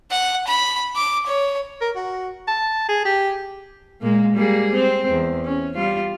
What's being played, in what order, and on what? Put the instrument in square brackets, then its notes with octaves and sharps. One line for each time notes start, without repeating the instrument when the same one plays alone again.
[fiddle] F#5
B5
D6
C#5
[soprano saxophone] A#4
F#4
A5
G#4
G4
[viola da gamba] A#2 G#3 A#3
G3 A#3 G#4
C4
E2
C#4
G3 F4